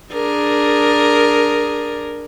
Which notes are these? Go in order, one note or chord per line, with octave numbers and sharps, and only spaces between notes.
D4 G#4 A#4